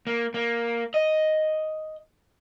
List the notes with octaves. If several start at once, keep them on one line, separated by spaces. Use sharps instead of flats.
A#3
A#3
D#5